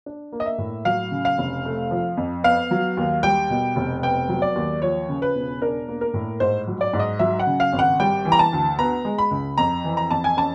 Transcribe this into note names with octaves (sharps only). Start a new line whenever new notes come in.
D4
A#3
D#5
E5
A2
F#3 F5
C#3
F5
F1
A3
F3
F2
B3 F5
F#3
D#2
G3 G5
B2
F1
B3 G5
F#3
D5
D#2
F3 C#5
C#3
B4
E1
D4 A#4
A#3
A#4
A2
G#2 C5
F#3
D5
G#2
D#5
F#3 E5
F#5
C#3
F5
G#1
F#5
G3 G5
E3
A#5
A5
D2
B3 A#5
G#3
B5
C#2
F2 A#5
E3
A#5
F2 A5
G#5
C#4 A5